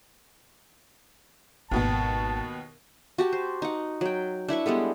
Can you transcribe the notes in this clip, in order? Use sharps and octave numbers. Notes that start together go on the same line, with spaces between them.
G#1 D#2 B2 B3 A5
F#4 G4 A5
C5
D#4 F#5
F#3 G5
D4 E4 B4 C#6
G3 G#3 B3 A4